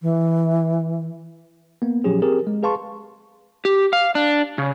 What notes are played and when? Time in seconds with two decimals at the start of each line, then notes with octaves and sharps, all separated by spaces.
0.02 E3
1.82 A#3 B3
2.04 A#2 F3 F#3 C#4 G4 G#4
2.22 C4 G4 G#4 A#4
2.47 G#3
2.63 G#4 B4 F5 A5 C6 C#6
3.65 G4
3.93 F5
4.15 D4
4.58 C#3